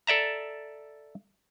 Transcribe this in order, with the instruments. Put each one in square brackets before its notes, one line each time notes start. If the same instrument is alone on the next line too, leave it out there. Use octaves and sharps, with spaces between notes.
[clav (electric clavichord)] A4 D5 E5 A#5